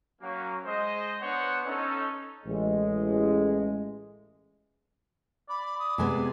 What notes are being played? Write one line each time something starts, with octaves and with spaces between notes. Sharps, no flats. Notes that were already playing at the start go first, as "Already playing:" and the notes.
F#3 A#3 C#4
G#3 C5 D#5
B3 D4 C5 C#5 F#5
C#4 D#4 A4
A1 G#3
D5 B5
D#6
C3 G#3 B3 G#5